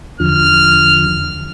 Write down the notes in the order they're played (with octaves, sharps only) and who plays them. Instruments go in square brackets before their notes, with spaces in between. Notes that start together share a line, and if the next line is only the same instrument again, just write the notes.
[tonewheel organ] E2 D3 F3 [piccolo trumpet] F6